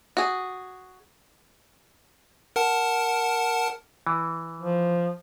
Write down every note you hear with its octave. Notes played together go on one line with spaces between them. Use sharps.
F#4 G#4
A#4 F#5 A5
E3
F3